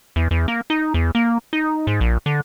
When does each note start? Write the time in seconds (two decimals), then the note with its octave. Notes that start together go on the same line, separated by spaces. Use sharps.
0.16 E2
0.31 E2
0.48 A#3
0.70 D#4
0.94 E2
1.15 A#3
1.53 D#4
1.87 G#2
2.01 A#1
2.26 D3